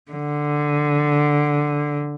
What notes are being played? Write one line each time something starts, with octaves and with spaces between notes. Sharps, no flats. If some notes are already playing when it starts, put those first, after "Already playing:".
D3